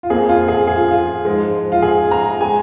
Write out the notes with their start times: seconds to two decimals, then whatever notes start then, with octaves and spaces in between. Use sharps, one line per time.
0.03 F4
0.10 F2 F3 A#3 G#4
0.29 F4
0.48 G#4
0.67 G#4
0.76 F4
0.91 F4
1.25 G#2 F3 G#3
1.72 F4
1.82 G#4
2.11 A#5
2.41 G#3 G#5